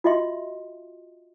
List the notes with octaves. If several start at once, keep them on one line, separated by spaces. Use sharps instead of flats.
F4 F#4 D#5 E5 C6